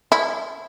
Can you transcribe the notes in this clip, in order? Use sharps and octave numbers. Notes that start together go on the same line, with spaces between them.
E4